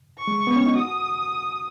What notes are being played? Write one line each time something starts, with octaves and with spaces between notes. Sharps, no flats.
C#6
G#3
B3
C#4
D#4
F#4 D#6